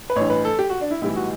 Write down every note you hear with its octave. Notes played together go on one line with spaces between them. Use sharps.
B4
A1 G2 E3 C#5
B4
A4
G4
F#4
D4
E4
B1 A2 E3 G3 E4
F#4